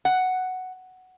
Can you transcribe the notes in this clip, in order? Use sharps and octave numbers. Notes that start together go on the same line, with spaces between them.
F#5